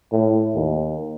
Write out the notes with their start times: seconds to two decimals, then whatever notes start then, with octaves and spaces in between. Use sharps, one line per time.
0.12 A2
0.55 D#2